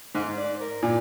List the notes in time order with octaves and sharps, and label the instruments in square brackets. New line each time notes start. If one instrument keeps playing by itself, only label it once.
[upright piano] G#2 [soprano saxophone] C5
[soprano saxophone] D5
C5
A#4
[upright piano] A#2 [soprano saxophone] D5